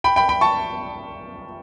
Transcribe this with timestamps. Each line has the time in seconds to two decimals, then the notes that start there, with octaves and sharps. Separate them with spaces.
0.04 G5 B5
0.16 G5 B5
0.29 G5 B5
0.41 A5 C#6